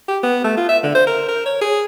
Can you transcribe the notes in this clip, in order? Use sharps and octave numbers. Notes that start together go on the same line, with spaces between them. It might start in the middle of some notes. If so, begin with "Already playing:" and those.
G4
B3
A3
F4
E5
D3
C5
A#4
A#4
C#5
G#4